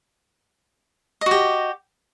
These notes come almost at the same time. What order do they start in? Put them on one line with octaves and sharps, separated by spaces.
D#5 F#4 G4